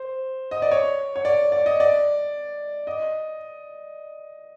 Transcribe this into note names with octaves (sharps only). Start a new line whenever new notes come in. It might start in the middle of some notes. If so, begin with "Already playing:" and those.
Already playing: C5
D#5
D5
C#5
C#5
D5
D5
D#5
D5
D#5